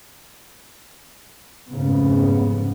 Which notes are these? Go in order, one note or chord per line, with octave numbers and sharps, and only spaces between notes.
F1 G#2 C#3 B3